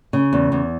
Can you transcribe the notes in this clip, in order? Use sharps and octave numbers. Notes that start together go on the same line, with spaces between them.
C#3
E2
E2